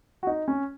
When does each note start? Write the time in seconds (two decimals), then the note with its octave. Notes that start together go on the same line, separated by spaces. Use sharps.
0.23 F#4
0.27 D#4
0.48 C#4